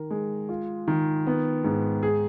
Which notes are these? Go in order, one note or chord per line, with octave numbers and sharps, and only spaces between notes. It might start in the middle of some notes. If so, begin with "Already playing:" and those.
Already playing: D#3 A#4
G#3
F4
D#3
B3
G#2
G#4